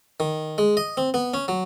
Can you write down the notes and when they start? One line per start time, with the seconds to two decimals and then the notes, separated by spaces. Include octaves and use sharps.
0.20 D#3
0.58 G#3
0.77 D#5
0.97 C4
1.14 B3
1.34 C#4
1.48 F#3